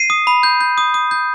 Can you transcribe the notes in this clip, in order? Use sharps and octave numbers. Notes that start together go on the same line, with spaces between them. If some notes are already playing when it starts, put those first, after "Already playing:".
Already playing: C7 D#7
D#6
B5
G6
G6
D#6
D#6
G6